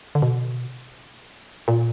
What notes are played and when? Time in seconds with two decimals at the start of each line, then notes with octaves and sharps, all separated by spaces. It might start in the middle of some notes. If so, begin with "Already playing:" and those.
0.15 D3
0.22 B2
1.68 A#2